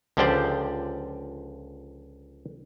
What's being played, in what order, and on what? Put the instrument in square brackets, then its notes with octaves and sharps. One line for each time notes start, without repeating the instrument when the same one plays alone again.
[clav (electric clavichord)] C#2 D3 F3 G4 C5 D5